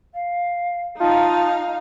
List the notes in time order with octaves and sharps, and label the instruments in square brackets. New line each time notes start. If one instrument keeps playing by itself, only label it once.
[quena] F5
[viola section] D#4 F5 [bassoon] F4 [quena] A5